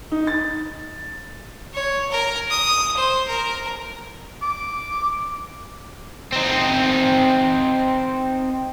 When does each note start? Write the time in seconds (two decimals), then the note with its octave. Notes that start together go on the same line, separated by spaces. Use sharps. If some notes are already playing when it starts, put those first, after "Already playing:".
0.12 D#4
0.27 A6
1.73 C#5
2.11 A#4
2.50 D#6
2.96 C5
3.27 A#4
4.42 D6
6.32 C4 D#4